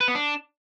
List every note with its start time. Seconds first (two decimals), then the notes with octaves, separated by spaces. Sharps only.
0.01 B4
0.08 B3
0.15 D4